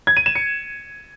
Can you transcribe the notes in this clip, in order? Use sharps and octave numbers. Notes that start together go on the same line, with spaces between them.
G#6
D#7
E7
C#7